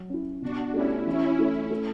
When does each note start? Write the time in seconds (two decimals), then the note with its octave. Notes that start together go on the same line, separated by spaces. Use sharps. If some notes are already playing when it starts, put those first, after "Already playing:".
Already playing: F#3
0.10 C#4 E4
0.42 B2 D4 F#4
0.74 A3 C#4 D4 E4 G4 D5
1.06 E3 C#4 E4
1.38 A3 E4
1.70 A3